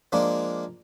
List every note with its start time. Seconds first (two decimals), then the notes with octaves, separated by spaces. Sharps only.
0.12 F3 G#3 A#3 D4